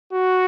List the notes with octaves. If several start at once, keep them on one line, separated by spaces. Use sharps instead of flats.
F#4